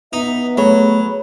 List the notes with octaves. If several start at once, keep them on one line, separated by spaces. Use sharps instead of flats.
B3 D#4 E5
F#3 A3 G#4 C#5 B5